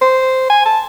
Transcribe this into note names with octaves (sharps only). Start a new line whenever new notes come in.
C5
G#5
A5